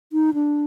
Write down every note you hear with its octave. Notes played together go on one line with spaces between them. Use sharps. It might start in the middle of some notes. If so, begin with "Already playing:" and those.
D#4
D4